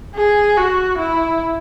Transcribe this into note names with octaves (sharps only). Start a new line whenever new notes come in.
G#4
F#4
E4